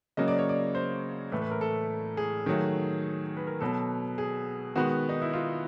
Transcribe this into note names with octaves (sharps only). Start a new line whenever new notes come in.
C#3 F#3 A#3 D#5
D5
C#5
D5
C5
A2 E3 A3 B4
B4
A#4
A4
G#4
D#3 F#3 A3
B4
A#4
B2 F#3 B3 A4
G#4
D#3 G#3 B3 F#4
D#4
E4
F4